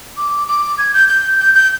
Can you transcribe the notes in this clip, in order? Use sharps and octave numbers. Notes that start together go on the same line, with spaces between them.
D6
D6
G#6
G6
G6
G6
G6